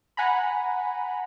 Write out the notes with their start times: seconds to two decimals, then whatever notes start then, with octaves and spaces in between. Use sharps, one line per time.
0.17 F#5 G#5 A#5 B5